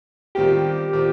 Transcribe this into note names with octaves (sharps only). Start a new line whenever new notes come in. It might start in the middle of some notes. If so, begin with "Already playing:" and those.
D#3 G3 C4 F4 G4 A#4
D#3 G3 C4 F4 A#4